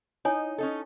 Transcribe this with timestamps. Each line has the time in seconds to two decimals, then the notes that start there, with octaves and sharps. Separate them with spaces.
0.25 D#4 E4 C#5 G#5
0.58 C#4 D#4 A4